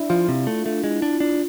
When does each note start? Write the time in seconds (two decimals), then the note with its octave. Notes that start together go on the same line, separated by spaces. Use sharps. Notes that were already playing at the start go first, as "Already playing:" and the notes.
Already playing: D4 E4
0.10 F3 F4
0.28 C3
0.47 A3
0.66 A3
0.84 G#3
1.02 D4
1.20 D4